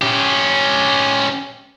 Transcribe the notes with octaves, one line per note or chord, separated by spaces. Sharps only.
C#4 G4